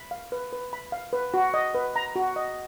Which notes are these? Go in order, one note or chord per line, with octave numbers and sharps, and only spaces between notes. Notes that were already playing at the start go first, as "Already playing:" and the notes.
Already playing: B5
F5
B4
B4
B5
F5
B4
F#4
D#5
B4
A#5
F#4
D#5